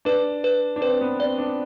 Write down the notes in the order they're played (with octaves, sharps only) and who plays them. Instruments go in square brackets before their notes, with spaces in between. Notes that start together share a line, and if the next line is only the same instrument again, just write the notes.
[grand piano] D4 [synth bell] B4
[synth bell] B4
[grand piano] D4
[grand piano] C4 [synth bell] B4
[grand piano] B3
[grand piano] C4 [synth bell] D5
[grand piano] D4